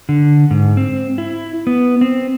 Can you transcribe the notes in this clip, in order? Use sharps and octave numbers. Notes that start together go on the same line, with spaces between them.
D3
G#2
C4
E4
B3
C4